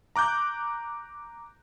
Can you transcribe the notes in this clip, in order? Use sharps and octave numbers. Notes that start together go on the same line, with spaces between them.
A#5 D6 F#6 G6